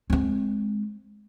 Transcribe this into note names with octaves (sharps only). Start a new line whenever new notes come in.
G#3 C4